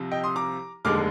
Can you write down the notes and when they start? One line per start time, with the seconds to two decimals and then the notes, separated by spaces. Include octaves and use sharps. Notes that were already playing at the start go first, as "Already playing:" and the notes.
Already playing: C2 C3 F3
0.11 D#5 G5
0.23 C6 D#6
0.36 A#5 D6
0.85 F1 D#2 D3 G#3 D6 F6